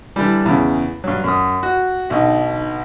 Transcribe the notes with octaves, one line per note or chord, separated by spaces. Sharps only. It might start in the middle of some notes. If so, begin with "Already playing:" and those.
D3 E3 G3
E2 C#3
G2 F#3
F#2 D#6
F#4
B1 D3 D#4